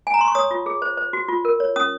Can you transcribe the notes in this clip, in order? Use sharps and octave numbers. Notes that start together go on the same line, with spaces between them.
G#5
A#5
C6
C#6
C#5 D#6
F4
G#4
C5
C5
F#4
F4
A#4
C#5
C#4 D#6